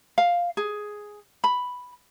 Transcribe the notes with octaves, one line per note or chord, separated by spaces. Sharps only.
F5
G#4
B5